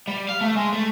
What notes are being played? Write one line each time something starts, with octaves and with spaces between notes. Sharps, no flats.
G3
F5
A3
G#3
A3